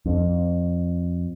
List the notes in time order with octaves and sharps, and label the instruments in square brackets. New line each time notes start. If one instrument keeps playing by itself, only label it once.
[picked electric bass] F2